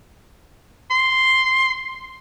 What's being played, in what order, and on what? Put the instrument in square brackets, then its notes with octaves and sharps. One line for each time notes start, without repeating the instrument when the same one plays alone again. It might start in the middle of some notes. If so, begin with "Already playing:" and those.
[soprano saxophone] C6